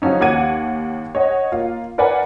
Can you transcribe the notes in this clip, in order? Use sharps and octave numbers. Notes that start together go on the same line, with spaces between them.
C#3 F3 F#3 C#4 D#4
D#2 F#5 D6 G#6 D#7
C#5 D#5 F#5
A#3 F4
A#4 B4 D5 F#5 G#5 B5